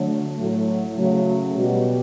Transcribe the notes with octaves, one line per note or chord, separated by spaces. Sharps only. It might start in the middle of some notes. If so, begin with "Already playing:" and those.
Already playing: D3 F#3 A3
A2 F#3 A3
C#3 F#3 A3
B2 G3 F#4